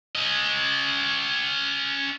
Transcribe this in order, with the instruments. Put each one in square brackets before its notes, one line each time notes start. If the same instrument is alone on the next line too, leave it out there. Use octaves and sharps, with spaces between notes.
[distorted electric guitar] C#4 D#5